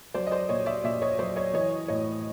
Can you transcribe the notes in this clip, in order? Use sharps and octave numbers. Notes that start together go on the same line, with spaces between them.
F#3 C5 D5
D#5
C5 D5
A#2 C#5 D#5
D5 E5
A#2 D5 E5
C#5 D#5
F#3 C5 D5
C#5 D#5
E3 C#5 D#5
A2 C#5 D#5